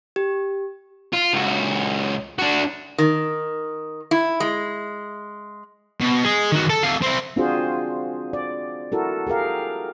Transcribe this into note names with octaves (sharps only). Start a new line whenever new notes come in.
G4
F4
C#2 F#4
D4 F#4
D#3
E4
G#3
B2
G#4 D#5
D#3 F#4
A4
A3 F5
C4 E4
C4 D4 F4 F#4 G#4 C5
D5
E4 F#4 A4 A#4
G4 G#4 A#4 F5